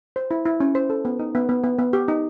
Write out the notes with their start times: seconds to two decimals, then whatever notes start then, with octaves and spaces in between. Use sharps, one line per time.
0.16 C5
0.31 E4
0.45 E4
0.60 C#4
0.75 C5
0.90 A4
1.05 B3
1.19 D#4
1.35 B3
1.49 B3
1.64 B3
1.79 B3
1.93 G4
2.08 D#4